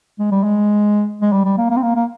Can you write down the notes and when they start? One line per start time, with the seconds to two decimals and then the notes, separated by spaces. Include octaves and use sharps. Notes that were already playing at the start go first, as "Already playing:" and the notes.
0.19 G#3
0.31 G3
0.43 G#3
1.22 G#3
1.33 G3
1.45 G3
1.58 A#3
1.70 A#3
1.77 C4
1.83 A#3
1.96 A#3